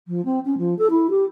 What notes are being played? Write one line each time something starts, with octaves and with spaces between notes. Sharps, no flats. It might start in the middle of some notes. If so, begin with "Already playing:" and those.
F3
C4
C#4
F3
A4
E4
G4